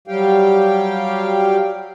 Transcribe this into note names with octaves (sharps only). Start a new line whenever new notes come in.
F#3 G3 G4 F5 G5